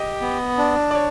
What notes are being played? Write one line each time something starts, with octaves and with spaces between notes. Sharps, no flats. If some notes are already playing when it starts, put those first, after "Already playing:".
Already playing: G4 D#5
B3
D4
D5
C#5